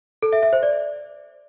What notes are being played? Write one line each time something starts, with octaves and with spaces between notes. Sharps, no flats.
A4
E5
E5
C5
D5